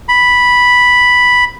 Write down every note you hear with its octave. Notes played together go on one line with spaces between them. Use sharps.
B5